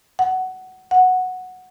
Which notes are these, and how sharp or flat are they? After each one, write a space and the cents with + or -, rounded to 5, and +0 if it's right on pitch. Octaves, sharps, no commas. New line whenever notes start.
F#5 +15
F#5 -5